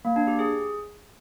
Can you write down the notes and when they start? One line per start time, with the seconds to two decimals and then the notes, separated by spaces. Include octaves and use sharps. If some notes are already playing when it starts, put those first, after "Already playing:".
0.05 A#3
0.16 D4
0.27 G4
0.39 G#4